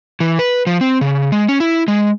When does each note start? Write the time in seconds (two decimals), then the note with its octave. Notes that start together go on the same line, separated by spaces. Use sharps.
0.20 E3
0.39 B4
0.67 F3
0.81 C4
1.01 C#3
1.32 G#3
1.49 C#4
1.60 E4
1.88 G#3